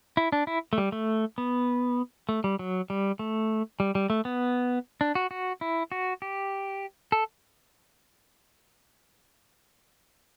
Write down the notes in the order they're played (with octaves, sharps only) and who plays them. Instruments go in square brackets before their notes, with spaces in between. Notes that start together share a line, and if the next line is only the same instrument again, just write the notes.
[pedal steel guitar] E4
D4
E4
A3
G3
A3
B3
A3
G3
F#3
G3
A3
G3
G3
A3
B3
D4
F#4
F#4
E4
F#4
G4
A4